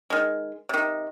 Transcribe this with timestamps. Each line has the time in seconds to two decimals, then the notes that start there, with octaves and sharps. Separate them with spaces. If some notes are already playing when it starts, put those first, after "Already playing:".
0.10 D#3 G#3
0.69 C3 D#3